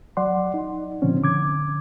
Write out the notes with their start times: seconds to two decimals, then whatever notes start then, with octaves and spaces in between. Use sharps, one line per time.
0.17 F#3 D5 F#5 C6
0.54 D#4
1.02 A#2 D3 F3 C4 C#4
1.23 D3 D6 G#6